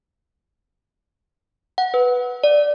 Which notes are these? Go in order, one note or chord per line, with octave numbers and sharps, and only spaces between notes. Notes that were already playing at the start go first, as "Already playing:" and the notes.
F#5
B4
D5